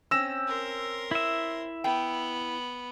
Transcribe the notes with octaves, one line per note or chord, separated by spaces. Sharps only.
C4 C#4 E6 A#6 E7
A#4 C6
E4 E5
B3 G5